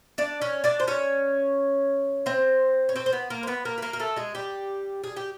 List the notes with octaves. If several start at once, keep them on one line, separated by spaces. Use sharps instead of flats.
D4 D5
C#4 C#5
D4 D5
C5
C#4 C#5
C4 C5
C#5
C4 C5
C5
B3 B4
A#3 A#4
C5
B3 B4
A#3 A#4
B4
A#3 A#4
A#4
A3 A4
G#3 G#4
G3 G4
G#4
G4